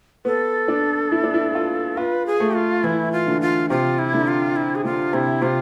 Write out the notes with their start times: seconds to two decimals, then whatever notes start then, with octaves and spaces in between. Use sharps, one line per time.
0.25 B3 A4
0.68 D4
1.12 E4
1.24 D4
1.34 E4
1.55 F4
1.97 F4 B4
2.26 G#4
2.40 A3
2.55 F4
2.84 E3 E4
3.12 F4
3.27 D3
3.41 F4
3.70 C3 F4
3.99 E4
4.14 D3
4.28 F4
4.56 E4
4.75 G#4
4.85 D3 F4
5.13 C3 E4
5.42 C3 F4